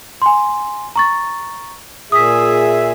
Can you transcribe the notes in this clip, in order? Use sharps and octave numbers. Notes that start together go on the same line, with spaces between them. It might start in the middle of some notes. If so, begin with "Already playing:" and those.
G#5 C6
A#5 C#6 A6
A#2 G#4 E5 D#6 B6